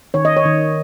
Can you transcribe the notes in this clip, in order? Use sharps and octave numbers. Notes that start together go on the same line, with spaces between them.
D#3 C#5
D#5
C#5
D#3